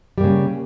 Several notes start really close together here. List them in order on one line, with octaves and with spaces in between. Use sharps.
G3 A#3 C#3